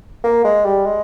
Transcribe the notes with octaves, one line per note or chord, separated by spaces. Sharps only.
A#3
G#3
G3
G#3